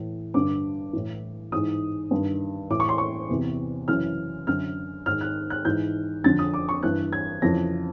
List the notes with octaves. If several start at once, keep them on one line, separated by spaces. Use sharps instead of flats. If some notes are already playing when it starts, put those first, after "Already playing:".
Already playing: A2 E3
G2 D3 D6
A2 E3
G#2 E3 D#6
G2 D#3
A2 E3 D6
C#6
C6
C#6
E2 C3 E3
F#2 C#3 E3 F6
F#2 D3 F6
G#2 D#3 F6
F#6
F#6
G#2 E3 G6
F2 D3 A6
D#6
D6
C#6
G2 E3 F#6
G#6
F2 C#3 E3 A#6